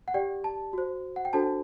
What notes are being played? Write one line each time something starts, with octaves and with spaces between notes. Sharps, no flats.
F#5
G4 D5 G5
A5
F#4 C5
F#5
G5
D4 F#4 A4 C5 A5